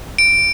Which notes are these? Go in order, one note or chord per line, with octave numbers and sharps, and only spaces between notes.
D7